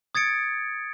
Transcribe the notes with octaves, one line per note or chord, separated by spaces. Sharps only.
D#6 G#6 A6 C#7 D7